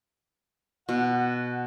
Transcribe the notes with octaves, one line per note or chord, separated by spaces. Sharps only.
B2 F#5